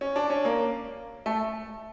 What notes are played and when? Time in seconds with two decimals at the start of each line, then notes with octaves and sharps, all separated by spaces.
0.01 C#4
0.16 D4
0.30 C#4
0.45 A#3
1.26 A3